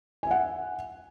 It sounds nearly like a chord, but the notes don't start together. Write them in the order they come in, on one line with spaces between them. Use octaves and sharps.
G#5 E5 F#5